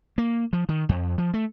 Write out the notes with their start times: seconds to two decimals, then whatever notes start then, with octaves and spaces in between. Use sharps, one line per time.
0.18 A#3
0.53 F3
0.69 D#3
0.89 F2
1.18 F3
1.34 A3